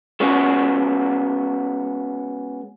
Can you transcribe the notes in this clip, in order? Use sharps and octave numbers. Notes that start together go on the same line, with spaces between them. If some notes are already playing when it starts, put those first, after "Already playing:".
G#3 B3 C#4 F#4